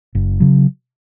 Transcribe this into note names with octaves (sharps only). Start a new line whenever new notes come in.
F#1
C#3 F#3